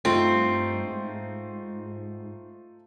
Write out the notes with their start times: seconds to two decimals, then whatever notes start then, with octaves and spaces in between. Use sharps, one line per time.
0.05 G2 A3 C4 D#4 F4
0.84 G#2